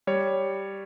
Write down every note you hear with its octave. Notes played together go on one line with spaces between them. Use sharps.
G3 C#5